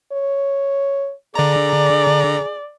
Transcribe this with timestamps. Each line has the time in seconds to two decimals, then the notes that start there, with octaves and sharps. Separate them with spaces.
0.12 C#5
1.35 D3 G#4 D5 A#5